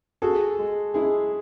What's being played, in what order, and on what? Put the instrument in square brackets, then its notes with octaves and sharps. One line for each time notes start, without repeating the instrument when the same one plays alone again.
[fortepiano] F#4 A4 [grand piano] G#4
[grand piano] G#3
[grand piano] G#3 [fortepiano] E4 G#4